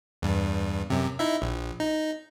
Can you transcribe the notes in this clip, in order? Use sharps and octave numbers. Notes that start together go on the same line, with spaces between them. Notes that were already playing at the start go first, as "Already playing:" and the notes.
E2 G2
F#2 C3
D#4 E4 E5
A#1
D#4